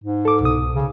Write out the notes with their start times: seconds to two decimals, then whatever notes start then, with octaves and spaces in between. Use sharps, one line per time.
0.04 G#2
0.25 A4 D6
0.41 C2 B2 D#6
0.74 C#3